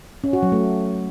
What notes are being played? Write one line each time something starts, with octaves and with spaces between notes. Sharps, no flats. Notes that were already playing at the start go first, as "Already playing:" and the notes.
C#4
F#4
F#3
A3